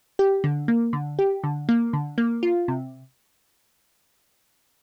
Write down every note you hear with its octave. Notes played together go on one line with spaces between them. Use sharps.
G4
D3
A#3
D3
G4
D3
A#3
D3
A#3
F4
C3